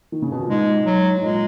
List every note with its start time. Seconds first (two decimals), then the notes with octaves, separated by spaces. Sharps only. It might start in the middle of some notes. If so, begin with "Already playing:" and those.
0.12 D#3
0.22 C#3
0.31 B2
0.41 A#2
0.49 G#2 G#3
0.86 F#3
1.17 G#2
1.22 A#2 G#3